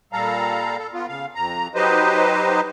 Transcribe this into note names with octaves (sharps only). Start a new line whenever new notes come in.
A#2 G3 A4 F5 A#5
A4
B3 F4
C#3 F5
F2 A#5
F#3 D#4 G4 B4 C5 D#5